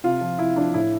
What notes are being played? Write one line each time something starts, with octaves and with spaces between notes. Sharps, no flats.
C3 F4
F3
C3 E4
F3 D4
A2 E4